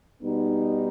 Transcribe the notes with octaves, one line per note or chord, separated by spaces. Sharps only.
B2 G3 B3 D#4